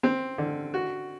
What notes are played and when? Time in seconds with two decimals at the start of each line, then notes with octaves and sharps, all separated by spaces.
0.03 C4
0.38 D3
0.74 F#4